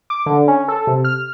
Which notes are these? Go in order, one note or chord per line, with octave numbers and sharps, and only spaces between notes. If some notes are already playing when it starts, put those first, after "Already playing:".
D6
D3
C#4
A4
C3
F6